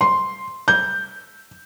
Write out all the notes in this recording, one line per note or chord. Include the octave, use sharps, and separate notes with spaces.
C6
G6